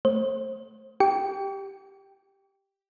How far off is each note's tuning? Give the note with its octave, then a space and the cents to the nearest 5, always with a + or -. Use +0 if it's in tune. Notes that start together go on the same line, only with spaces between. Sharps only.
A3 +0 C5 +35
G4 +0 G5 +0 D6 -45